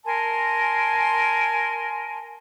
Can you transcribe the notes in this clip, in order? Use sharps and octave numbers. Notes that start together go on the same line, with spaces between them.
A#4 G#5 A5 C6